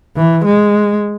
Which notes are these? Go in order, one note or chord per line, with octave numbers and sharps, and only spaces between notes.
E3
G#3